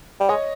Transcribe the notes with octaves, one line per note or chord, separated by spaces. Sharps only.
G3
G#3 C#5 D#5